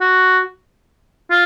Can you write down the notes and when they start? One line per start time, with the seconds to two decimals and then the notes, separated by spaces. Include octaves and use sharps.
0.01 F#4
1.31 F4